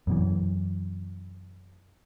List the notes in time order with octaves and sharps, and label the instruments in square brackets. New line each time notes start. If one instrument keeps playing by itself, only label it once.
[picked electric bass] F#2 B2 E3